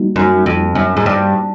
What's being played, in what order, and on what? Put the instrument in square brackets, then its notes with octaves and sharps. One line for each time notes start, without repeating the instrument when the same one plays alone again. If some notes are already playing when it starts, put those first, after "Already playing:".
Already playing: [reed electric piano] G3 A#3 D#4 F#4
[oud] F#2
F2
F#2
G#2
G2